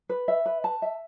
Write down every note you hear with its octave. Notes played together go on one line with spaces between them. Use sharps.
B4
E5
B4
A5
E5